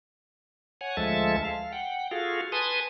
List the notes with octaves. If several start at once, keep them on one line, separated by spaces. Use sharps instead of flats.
C#5 F#5 G#5
D2 F3 G#3 A4 E5 A5
F5
F#5 G5
F4 F#4 G#4 A4 F5
B4 G#5 A5 C6 D#6